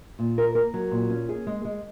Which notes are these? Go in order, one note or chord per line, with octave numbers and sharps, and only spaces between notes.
A#2
A#4
A#4
F#3
A#2
C#4
G#4
G#3
G#3